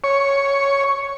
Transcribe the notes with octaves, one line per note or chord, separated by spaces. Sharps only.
C#5